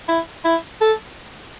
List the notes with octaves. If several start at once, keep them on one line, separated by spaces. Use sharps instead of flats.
E4
E4
A4